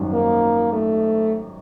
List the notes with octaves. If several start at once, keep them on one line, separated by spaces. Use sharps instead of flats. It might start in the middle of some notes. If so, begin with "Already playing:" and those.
Already playing: G#1 F#2 D#3 G3
A#3
A3